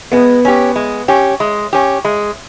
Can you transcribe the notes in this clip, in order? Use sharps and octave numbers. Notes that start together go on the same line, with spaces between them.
G#3 B3
C#4 G4
G#3
C#4 G4
G#3
C#4 G4
G#3